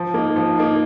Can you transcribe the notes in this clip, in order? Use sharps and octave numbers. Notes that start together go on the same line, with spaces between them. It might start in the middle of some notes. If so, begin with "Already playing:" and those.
Already playing: F3
A#3 D#4
F3
A#3 D#4